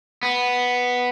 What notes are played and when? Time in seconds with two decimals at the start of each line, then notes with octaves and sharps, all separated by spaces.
0.23 B3